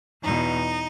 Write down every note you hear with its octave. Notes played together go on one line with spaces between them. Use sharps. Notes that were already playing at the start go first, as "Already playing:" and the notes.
E2 B2 D#4